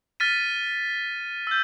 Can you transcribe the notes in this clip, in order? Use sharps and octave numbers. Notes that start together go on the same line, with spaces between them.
F6 A6 B6 D#7
E6 G6